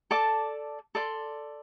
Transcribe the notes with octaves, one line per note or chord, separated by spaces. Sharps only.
A4 D5 A5 D6
A4 D5 C6